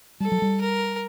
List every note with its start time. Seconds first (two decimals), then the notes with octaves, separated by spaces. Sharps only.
0.20 G3 A4
0.32 F#3
0.42 G3
0.61 A#4